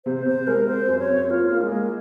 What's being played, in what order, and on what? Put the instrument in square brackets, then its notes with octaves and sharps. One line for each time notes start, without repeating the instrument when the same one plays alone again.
[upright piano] C3 [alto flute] C5
[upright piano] C3 [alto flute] C5
[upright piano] G#3 [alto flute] A#4
[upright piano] C4 [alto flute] C5
[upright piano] F#2
[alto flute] C#5
[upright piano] C4
[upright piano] A#3 [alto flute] F4
[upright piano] A#3
[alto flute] G#3
[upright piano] A#3